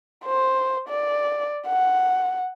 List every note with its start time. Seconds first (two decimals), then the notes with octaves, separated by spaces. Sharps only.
0.24 C5
0.88 D5
1.67 F#5